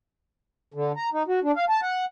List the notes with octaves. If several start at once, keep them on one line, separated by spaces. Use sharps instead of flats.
D3
A#5
D#4
F#4
D4
F5
A5
F#5